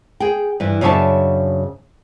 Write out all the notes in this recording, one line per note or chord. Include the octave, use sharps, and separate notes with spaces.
G#4 G5
G2 E3
F#2 C#3 D4 C#5 E5 A5